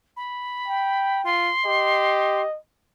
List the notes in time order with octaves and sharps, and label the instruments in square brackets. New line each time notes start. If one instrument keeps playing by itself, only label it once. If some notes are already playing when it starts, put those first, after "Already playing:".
[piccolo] B5
[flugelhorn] G5
[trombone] F4 [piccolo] C6
[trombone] G4 [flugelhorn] D#5